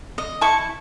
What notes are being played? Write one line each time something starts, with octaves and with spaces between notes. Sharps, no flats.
D#5
E4 A5 C#6